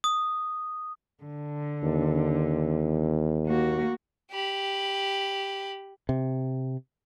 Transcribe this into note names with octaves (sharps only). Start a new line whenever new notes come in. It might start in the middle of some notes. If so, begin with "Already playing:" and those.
D#6
D3
D#2
A#3 F#4
G4 B5
C3